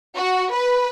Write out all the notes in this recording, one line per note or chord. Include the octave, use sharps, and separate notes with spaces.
F#4
B4